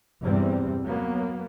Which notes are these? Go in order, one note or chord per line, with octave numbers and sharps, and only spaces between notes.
E2 G2 C3 G3 C4
F#3 A#3 B3